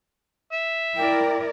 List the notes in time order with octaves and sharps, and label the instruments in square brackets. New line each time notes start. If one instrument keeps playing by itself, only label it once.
[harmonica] E5
[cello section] E4 A#4 D5 [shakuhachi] G5